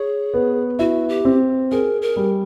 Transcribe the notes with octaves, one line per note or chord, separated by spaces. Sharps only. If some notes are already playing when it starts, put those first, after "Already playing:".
Already playing: G#4 C#5
B3
E4 F#4
G4
C4
G#4 A#4
A#4
G3